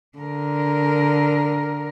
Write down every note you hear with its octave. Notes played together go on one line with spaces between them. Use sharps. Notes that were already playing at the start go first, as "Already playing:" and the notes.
D3 A#4